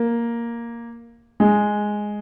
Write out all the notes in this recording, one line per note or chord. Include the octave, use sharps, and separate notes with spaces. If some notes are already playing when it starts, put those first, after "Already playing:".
Already playing: A#3
G#3